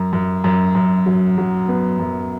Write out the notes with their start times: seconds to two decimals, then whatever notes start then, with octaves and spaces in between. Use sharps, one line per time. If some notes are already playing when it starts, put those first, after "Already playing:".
Already playing: F#2
0.13 F#2
0.44 F#2
0.75 F#2
1.06 F#3
1.38 F#3
1.68 B3
2.00 F#2